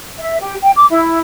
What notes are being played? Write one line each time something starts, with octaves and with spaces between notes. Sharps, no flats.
E5
G4
G5
D6
E4